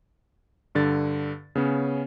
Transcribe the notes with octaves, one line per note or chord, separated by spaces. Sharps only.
G2 D3 A6
C#3 B3 C#4